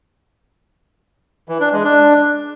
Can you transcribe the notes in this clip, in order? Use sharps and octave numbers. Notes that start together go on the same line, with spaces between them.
E3
D4
G#3
D4